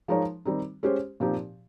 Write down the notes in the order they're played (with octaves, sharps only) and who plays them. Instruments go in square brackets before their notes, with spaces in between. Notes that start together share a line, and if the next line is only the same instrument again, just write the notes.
[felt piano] F3 G#3 D#4 A#4 C#5
D#3 G3 C4 D#4
G#3 C#4 G4 C5
A#2 F3 C4 D#4 G4